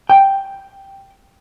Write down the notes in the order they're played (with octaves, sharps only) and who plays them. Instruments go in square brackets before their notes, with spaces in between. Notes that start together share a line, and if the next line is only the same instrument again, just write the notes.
[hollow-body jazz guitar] G5